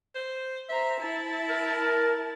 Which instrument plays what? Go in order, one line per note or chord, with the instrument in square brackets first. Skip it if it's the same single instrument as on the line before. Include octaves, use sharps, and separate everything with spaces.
[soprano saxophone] C5
[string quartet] C5 A#5 [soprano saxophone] E5
[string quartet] E4 A5
[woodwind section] A#4